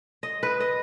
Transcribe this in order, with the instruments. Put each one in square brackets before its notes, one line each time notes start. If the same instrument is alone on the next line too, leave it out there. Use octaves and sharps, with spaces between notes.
[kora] D#5
B4
D#5